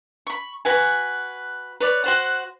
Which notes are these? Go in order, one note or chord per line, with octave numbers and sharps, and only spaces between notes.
B5 C#6
F#4 B4 G#5
B4 C#5 D5
F#4 C5 F#5